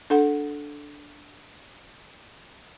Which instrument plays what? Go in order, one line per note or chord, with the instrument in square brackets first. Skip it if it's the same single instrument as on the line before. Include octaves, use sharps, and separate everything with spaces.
[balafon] D4 A4 F#5